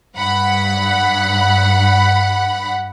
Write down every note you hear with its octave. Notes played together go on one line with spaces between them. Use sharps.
G2 F#5 B5